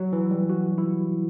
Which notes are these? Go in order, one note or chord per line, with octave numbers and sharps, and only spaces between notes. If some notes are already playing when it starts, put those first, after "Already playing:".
Already playing: F#3
E3
G3
F#4
E4